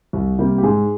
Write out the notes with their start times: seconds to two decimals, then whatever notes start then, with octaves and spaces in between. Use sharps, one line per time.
0.13 C2
0.39 C3 G3 A#3
0.58 G4
0.63 G#2 G#4